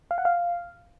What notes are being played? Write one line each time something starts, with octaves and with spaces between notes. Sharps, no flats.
F5
F#5
F5